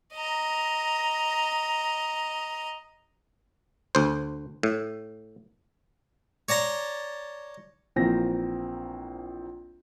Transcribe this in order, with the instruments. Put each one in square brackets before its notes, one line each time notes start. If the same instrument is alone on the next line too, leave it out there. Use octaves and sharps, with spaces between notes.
[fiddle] D#5 A#5
[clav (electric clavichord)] D2 C5
A2
[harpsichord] C#5 D5 A5 A#5 C6
[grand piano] A#1 E3 A#3 C4 G5 A#6